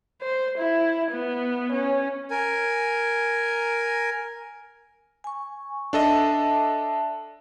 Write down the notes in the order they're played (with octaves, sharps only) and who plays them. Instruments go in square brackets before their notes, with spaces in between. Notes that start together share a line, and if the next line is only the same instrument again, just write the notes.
[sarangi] C5
E4
B3
C#4
[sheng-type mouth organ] A#4 G#5
[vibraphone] G#5 C#6
[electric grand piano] D4 A4 D#5 [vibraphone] E5 A5